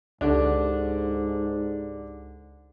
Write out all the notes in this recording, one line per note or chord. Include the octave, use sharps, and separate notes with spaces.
C#2 G#2 D3 D4 D#4 G4 A4